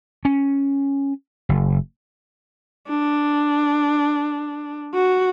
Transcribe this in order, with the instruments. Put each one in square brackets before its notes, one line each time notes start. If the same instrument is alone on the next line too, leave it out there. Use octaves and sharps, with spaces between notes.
[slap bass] C#4
F#1
[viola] D4
F#4